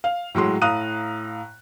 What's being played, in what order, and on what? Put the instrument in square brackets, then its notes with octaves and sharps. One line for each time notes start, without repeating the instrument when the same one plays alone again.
[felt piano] F5
A2 F#3 G#3 C6
A2 F5 A#5 D#6 F#6 D#7